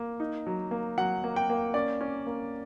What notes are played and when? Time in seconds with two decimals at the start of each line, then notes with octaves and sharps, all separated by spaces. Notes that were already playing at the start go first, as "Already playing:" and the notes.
Already playing: A#3
0.20 D#4
0.47 F#3
0.71 A#3
0.98 F#3 F#5
1.24 A#3
1.36 G5
1.49 A#3
1.74 C#4 D5
2.01 C#4
2.27 A#3